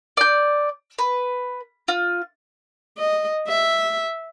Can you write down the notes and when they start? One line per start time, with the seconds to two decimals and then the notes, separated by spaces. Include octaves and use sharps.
0.17 D5 G6
0.99 B4
1.88 F4
2.98 D#5
3.48 E5